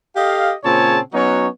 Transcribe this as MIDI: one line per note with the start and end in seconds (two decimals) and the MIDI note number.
0.15 0.53 67
0.15 0.53 69
0.15 0.53 75
0.15 0.53 77
0.64 0.99 46
0.64 0.99 49
0.64 0.99 60
0.64 0.99 68
0.64 0.99 73
0.64 0.99 81
1.13 1.47 54
1.13 1.47 59
1.13 1.47 61
1.13 1.47 63
1.13 1.47 66
1.13 1.47 73